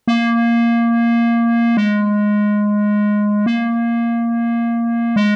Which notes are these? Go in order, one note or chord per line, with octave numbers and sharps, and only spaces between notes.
A#3
G#3
A#3
G#3